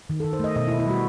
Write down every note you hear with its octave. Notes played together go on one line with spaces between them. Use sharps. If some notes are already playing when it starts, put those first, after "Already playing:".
D#3
A4
D#3
C5
A3 D#5
B2 D#5
E4
B2
E4
G3 F#4